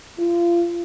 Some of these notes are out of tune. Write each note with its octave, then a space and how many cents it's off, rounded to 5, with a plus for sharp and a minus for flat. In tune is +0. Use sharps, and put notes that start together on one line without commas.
F4 -30